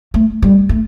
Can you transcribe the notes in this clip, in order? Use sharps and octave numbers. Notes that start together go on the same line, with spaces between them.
A3
G3
A3